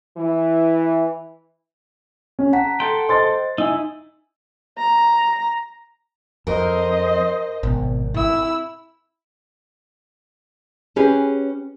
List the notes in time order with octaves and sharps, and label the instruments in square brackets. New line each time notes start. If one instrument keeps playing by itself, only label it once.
[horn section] E3
[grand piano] C#4
[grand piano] F#5 [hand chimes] A5 A#5 B6
[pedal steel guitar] A4 G5 [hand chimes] C6
[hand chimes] C5 D#5 [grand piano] C6 A6
[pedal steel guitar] D#4 E4 [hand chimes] G#5 E6
[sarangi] A#5
[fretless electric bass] F2 [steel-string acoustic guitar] A#4 [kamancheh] C5 D#5
[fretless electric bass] G#1 [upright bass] B2
[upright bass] C4 [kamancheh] E4 E6
[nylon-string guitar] C#4 G4 G#4 B4